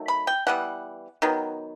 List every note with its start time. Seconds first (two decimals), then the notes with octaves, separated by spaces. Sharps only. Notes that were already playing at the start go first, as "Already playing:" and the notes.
Already playing: D#3 F#3 A3
0.08 B5
0.27 G5
0.47 E3 G3 B3 F#5
1.22 D#3 F#3 B3